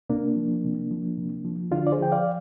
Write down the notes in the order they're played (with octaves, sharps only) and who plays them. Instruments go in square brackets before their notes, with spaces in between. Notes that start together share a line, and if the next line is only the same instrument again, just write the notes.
[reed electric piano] C3 A#3 D4
F3
C3
F3
C3
F3
D3 D4 F4
D5
G#4 C5
F3 G5
D5 F5